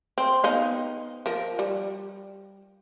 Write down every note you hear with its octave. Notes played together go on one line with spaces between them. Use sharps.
C4
B3 D#4 F5
F3 A#4
G3